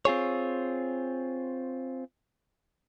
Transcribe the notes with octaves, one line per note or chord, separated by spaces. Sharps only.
C4 F4 G#4 C#5